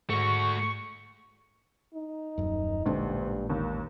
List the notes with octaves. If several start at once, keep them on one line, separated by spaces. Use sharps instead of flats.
G#2 A3 F#4 C#6
D#4
D#1 F#2
A1 D2 G2 A#2 G#3
D#2 A#3